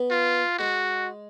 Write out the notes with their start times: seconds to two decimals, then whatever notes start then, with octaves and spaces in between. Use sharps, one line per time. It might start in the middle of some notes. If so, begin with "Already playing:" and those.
Already playing: B3
0.11 F4
0.59 G#3 F#4